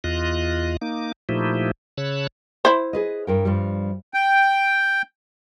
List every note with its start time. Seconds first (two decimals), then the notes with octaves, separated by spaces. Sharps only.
0.04 E2 F4 D#5 F#6
0.81 A#3 D#4 D6
1.29 A#2 F3 A3 D#4 E4 G4
1.98 C#3 C#5 A5 B5 E6 F#6
2.65 E4 C5
2.93 G#4 B4 D#5
3.27 G2 A#4 G5
3.45 G2 F3 G3
4.14 G5